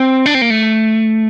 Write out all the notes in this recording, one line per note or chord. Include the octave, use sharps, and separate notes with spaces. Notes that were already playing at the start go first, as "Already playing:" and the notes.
Already playing: C4
D4
C4
A#3
A3